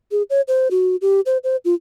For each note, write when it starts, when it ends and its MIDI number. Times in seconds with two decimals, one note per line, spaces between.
0.11 0.23 68
0.30 0.41 73
0.48 0.68 72
0.71 0.96 66
1.02 1.21 67
1.26 1.38 72
1.44 1.56 72
1.65 1.74 65